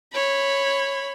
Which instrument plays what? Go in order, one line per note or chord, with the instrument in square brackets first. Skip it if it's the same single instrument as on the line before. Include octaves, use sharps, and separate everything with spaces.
[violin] C#5 B5